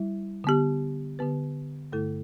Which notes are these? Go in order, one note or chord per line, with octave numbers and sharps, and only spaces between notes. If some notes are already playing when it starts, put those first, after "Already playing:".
Already playing: G3 E4
D3 B3 G4
D3 B3 G4 B4
G2 D3 A3 E4 A4